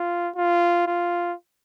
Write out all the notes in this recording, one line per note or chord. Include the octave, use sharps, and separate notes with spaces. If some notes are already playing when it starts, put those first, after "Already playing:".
Already playing: F4
F4
F4